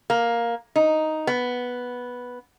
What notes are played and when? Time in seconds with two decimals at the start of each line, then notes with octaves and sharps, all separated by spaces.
0.10 A#3
0.76 D#4
1.27 B3